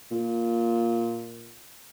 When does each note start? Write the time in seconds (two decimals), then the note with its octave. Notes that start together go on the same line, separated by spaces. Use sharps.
0.11 A#2